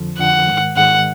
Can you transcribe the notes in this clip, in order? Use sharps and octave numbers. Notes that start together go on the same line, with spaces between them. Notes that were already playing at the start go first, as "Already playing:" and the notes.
Already playing: F2 D3 F3
F2 D3 F3 F#5
G#2 D#3 G#3
G#2 D#3 G#3 F#5